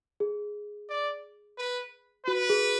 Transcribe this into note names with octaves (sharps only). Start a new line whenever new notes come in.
G#4
D5
B4
F#4 B4
G#4